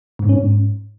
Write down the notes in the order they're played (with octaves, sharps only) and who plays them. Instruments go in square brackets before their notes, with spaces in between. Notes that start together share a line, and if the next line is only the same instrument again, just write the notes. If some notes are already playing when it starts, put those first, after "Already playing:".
[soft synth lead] G#2
C#4
G#2